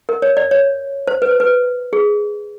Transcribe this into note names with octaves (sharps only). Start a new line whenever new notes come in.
A#4
C#5
D5
C#5
C5
B4
C5
B4
G#4